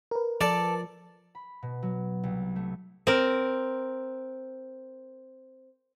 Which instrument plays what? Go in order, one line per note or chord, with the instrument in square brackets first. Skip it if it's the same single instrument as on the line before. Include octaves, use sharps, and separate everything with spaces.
[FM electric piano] A#4 B4
[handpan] F3 [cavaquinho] A4 [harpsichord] D5
[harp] B5
B2
F#3
C2
A3
[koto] C4 A#4